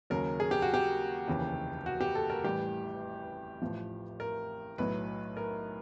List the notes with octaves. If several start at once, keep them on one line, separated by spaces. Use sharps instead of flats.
D#2 C#3 F#3 A#4
G#4
G4
F#4
G4
F1 D#2 C#3 E3
F#4
G4
A4
A#4
A1 A2 E3 G3 G4
A1 A2 F3
A#4
B1 A2 F#3 B4
A#4